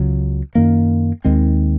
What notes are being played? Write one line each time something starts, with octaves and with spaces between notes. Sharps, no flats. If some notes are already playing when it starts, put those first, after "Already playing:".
Already playing: C#2 C#3 F#3
F#2 D#3 A#3
D#2 D#3 G#3 C4